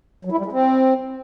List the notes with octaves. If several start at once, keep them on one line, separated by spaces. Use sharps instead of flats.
F#3
E4
G3
G#3
C4